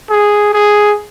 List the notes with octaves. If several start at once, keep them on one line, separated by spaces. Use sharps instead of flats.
G#4
G#4